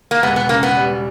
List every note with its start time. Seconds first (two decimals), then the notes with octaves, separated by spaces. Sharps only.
0.11 A#3
0.23 E1 B3
0.36 B3
0.49 C#3 A#3
0.63 B3
0.77 G3